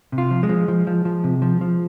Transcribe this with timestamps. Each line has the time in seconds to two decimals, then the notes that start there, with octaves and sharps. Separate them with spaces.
0.12 C3
0.18 F4
0.31 F3
0.43 G#3
0.49 F3
0.68 F3
0.87 F3
1.05 F3
1.24 C3
1.42 F3
1.61 F3